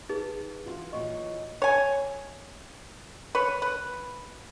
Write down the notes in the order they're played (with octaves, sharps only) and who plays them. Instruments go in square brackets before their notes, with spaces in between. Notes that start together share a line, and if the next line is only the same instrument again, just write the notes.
[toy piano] D#4 G#4 B4
[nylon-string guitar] E3 F4 F#4
[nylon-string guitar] A#2 E3 F#3 [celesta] D#5 C#6
[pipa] C#5 G#5
B4 C#5
B4